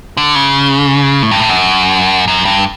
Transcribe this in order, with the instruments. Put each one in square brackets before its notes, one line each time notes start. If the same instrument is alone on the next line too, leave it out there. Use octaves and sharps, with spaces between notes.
[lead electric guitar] D3
C#3
A2
G2
A2
F#2
F#2
G2